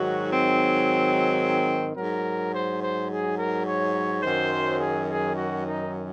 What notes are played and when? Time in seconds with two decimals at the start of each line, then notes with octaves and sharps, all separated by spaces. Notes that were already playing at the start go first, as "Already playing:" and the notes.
Already playing: G#2 D#3 F#3 F#4
0.28 C4
1.97 G#2 F#3 A#4
2.53 C5
2.82 C5
3.10 G#4
3.38 A#4
3.67 C#5
4.23 F#2 D#3 F#3 C5
4.79 G#4
5.08 G#4
5.36 F#4
5.65 D#4